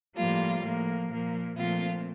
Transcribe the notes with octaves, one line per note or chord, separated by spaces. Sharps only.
A2 F3 G3 A#3 F4
A2 F3 A#3
A#2 F3 A#3
A#2 F3 A3 C4 F4